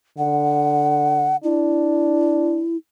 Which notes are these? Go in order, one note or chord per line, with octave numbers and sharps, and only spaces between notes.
D3 F#5
D4 E4